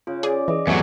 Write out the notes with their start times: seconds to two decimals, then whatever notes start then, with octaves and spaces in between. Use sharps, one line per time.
0.07 C#3 F4
0.23 G#4 D5
0.48 E3 G#4 D#5
0.67 E2 F#3 A3 D5 F#5 G#5